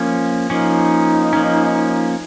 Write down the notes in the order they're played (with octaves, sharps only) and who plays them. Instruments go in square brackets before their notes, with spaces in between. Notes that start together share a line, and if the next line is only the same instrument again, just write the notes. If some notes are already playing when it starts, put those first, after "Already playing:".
Already playing: [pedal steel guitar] F3 A#3 C#4
[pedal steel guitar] F3 A#3 C#4 [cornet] D#4
[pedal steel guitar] F3 A#3 C#4